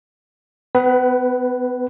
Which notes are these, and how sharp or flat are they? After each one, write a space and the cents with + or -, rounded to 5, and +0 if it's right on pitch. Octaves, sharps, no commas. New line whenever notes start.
B3 +35 B4 +0